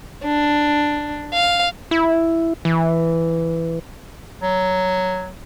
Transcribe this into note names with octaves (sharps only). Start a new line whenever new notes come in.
D4
F5
E4
E3
F#3